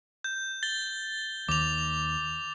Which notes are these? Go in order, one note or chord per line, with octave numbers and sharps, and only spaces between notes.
G6
A6 G7
D#2 D6 F7